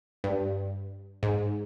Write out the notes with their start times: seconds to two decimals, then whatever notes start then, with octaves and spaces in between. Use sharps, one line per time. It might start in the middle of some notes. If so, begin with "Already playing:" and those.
0.24 G2
1.23 G#2